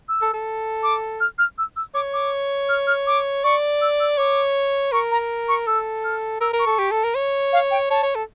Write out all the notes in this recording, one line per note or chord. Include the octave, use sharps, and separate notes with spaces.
E6
A4
A4
D6
F6
F6
E6
E6
C#5 D6
D6
F6
F6
D6
D5 C#6
E6
E6
C#5 D6
A#4 C#6
A#5
C#6
A4 E6
F6
A#4 E6
A#4
C#6
A4
G4
A4
A#4
C#5
F5
G5
C#5 A5
C#5
A4